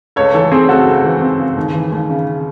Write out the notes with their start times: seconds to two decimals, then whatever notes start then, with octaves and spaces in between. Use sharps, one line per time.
0.16 C#2 A4 C#5
0.34 E3 A4 C#5
0.52 C4 G#4 C5
0.69 C#3 F#4 A4
0.86 C#2
1.05 E3
1.22 C4
1.39 C#3
1.57 D#2
1.74 E3
1.92 D#2
2.10 C#3